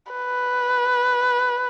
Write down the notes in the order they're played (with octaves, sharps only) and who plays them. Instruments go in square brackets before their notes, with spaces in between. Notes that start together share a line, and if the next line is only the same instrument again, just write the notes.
[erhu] B4